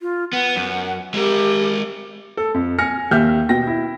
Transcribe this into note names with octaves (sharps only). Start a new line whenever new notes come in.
F4
B3 F#5
F#2
G#3 G4 A#4
A4
F2
G#5 F6 A#6 C#7
D#2 G4 E5 F6 G6
B2 G5 A#6
E4